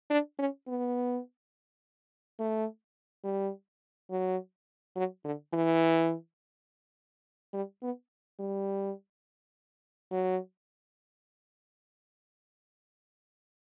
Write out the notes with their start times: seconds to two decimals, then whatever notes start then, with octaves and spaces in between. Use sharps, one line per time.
0.10 D4
0.39 C#4
0.68 B3
2.39 A3
3.24 G3
4.11 F#3
4.96 F#3
5.25 D3
5.53 E3
7.53 G3
7.82 B3
8.40 G3
10.11 F#3